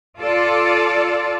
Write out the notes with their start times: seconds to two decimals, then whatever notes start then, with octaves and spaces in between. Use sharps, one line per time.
0.19 F4 A4 D5